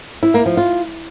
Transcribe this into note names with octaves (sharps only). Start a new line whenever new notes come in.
E4
A#3
F3
F4